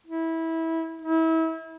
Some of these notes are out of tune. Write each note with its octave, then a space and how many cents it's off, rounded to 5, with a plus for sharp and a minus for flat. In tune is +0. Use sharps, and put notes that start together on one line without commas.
E4 -20
E4 -30